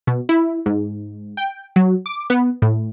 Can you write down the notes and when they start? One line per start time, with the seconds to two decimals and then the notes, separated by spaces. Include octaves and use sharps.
0.07 B2
0.29 E4
0.66 G#2
1.37 G5
1.76 F#3
2.06 D6
2.30 B3
2.62 A2